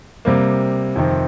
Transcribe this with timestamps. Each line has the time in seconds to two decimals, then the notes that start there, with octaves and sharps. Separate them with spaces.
0.25 C3 G3 A#3
0.96 F2 C3 D#3 C4